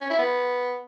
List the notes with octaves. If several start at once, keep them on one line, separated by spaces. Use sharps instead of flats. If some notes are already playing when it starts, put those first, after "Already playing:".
C#4
E4
B3